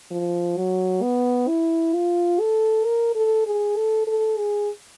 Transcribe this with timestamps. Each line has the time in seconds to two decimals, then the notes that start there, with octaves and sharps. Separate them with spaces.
0.11 F3
0.57 F#3
1.02 B3
1.48 E4
1.94 F4
2.40 A4
2.85 A#4
3.15 A4
3.46 G#4
3.77 A4
4.07 A4
4.38 G#4